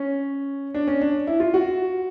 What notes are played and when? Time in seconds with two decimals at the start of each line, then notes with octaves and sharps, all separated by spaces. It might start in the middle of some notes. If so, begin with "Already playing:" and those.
Already playing: C#4
0.74 D4
0.88 C#4
1.01 D4
1.27 E4
1.40 F4
1.54 F#4